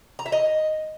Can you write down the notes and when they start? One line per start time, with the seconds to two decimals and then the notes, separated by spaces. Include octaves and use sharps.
0.19 A#5
0.26 E5
0.32 D#5